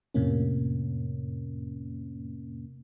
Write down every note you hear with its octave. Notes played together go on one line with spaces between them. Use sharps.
F2 A2 C3 A#3 C#4